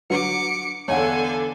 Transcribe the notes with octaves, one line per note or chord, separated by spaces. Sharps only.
D3 F#3 B4 D6 C#7
E2 D3 B3 A4 C#5 F5 F#5 G#5